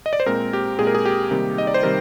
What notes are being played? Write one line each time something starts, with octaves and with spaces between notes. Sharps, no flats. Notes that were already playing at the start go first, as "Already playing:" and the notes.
D#5
D5
C5
A#2 G#3 C4 A#4
G4
A#2 G#3 C4 G#4
A#4
G#4
G4
C3 D#3 G3 A#3 D#4
D#5
D5
C5
C3 D#3 G3 A#4